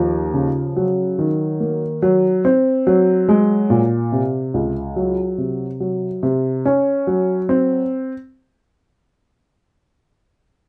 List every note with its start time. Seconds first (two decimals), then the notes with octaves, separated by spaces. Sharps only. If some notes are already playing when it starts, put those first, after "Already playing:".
Already playing: D#2 F3
0.34 C#3
0.76 F#3
1.19 D#3
1.60 A#3
2.02 F#3
2.45 C4
2.87 F#3
3.29 G#3
3.70 A#2
4.12 C3
4.54 C#2
4.96 F#3
5.38 C3
5.80 F#3
6.23 C3
6.66 C#4
7.07 F#3
7.49 C4